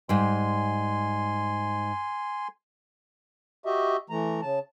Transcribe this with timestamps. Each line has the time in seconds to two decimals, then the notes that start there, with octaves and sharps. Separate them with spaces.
0.09 G#2 G3 G#5 C6
3.65 F#4 G4 D#5 E5
4.10 E3 A3 A#5
4.42 C#3 A5